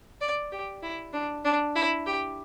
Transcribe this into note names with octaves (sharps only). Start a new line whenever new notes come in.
D5
G4
E4
D4
D4
E4
G4